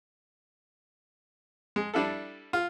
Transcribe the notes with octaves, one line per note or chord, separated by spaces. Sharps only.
G#3
G3 D4 E4 A4
F4